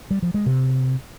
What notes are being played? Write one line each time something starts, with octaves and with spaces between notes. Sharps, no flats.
G3
F3
G#3
C3